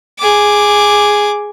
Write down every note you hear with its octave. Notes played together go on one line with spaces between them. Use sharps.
G#4 D6